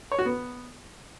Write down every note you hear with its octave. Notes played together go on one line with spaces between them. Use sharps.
C#5
F#4
B3